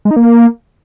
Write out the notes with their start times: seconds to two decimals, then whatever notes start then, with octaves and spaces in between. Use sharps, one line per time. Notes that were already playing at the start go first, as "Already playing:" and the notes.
0.05 G#3
0.11 D#4
0.16 A#3